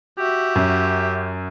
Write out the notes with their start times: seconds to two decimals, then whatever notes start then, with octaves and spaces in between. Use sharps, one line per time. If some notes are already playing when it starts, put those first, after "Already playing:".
0.18 F#4 G4 E5
0.55 F#2